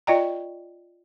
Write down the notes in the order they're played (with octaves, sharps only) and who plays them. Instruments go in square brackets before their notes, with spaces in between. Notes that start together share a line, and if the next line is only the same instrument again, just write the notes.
[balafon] F4 D5 D#5 G5 A#5